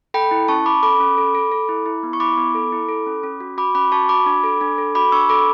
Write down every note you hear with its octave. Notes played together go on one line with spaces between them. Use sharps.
A4 G5 B5
E4
C#4 A5 C#6
C#4 B5 D6
A4 B5 D6
C#4
A4
A4
A4
E4
E4
B3
C#6
E4 B5 D6
B3
A4
E4
A4
C#4
C#4
F#4
F#4 B5 D6
C#4 B5 D6
F#4 A5 C#6
F#4 B5 D6
D4
A4
D4
A4
F#4 B5 D6
D4 C#6 E6
A4 B5 D6